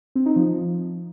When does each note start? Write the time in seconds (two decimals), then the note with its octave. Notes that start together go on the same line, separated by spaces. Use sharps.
0.15 C4
0.26 D#4
0.36 F3